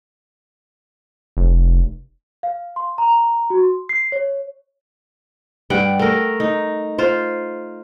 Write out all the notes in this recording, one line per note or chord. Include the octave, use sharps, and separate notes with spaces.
F1
F5
C6
A#5
F#4
C6
C7
C#5
G2 F#5 G5
A3 A#4
D#4
F4 C5